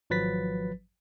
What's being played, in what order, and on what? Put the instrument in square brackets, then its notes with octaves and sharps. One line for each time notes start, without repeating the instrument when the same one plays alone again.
[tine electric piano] G#1 F3 F#3 B4 A6 B6